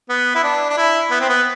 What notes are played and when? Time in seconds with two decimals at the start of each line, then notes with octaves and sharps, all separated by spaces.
0.09 B3
0.35 E4
0.43 D4
0.69 D4
0.77 E4
1.11 B3
1.20 C4
1.29 B3